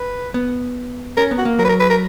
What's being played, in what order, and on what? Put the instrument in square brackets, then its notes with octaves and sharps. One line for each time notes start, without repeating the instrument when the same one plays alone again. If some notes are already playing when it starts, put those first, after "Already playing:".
Already playing: [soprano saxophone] B4
[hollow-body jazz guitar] B3
[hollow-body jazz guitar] C#4 [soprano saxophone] A#4
[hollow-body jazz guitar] B3
[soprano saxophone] F#4
[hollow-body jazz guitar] A#3
[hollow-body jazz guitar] F#3 [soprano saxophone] A#4
[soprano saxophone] B4
A#4
B4
A#4